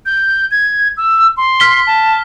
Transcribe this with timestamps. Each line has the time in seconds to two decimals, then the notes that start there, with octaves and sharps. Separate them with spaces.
0.06 G6
0.51 G#6
0.97 E6
1.37 C6
1.60 F6 B6 G7
1.87 A5